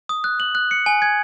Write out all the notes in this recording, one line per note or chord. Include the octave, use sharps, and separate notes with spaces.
D#6
F#6
F#7
F#6
C#7
G#5
G#6